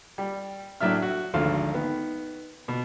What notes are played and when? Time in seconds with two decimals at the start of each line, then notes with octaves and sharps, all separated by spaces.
0.18 G3
0.81 A2 F#3 D4 E5 F6
1.02 F#4
1.34 G#1 D2 D3 F3 F5
1.73 D#3 B3
2.68 B2